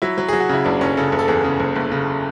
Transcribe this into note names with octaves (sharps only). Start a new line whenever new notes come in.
F#3 E4
F#3
F#3 G#4
F#4
C#3 E4
F#1 D4
F#1 C#4
C#3 A4
F#1
A4
E2 G#4
C#3
F#1
F#1
C#3